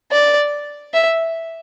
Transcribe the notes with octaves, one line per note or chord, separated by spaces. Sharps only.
D5
E5